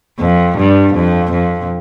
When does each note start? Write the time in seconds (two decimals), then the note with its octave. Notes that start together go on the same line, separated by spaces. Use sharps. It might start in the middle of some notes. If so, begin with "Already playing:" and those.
0.19 F2
0.58 G2
0.94 F2
1.32 F2